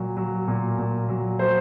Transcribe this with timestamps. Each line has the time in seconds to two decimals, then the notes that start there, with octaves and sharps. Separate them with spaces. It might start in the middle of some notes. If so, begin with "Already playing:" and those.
Already playing: A#2 F#3
0.17 F#3
0.48 A#2
0.78 A#2
1.09 F#3
1.39 F#3 C5